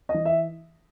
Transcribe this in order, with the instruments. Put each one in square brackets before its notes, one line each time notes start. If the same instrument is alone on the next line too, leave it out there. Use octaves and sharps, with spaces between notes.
[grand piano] D#5
E3
E5